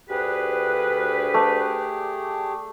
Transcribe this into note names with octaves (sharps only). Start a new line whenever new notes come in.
D2 G4 G#4 B4
A3 D5